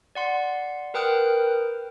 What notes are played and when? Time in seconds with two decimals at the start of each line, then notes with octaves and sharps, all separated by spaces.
0.15 D5 F#5 C6
0.94 A#4 B4 G5 D#6 F6 F#6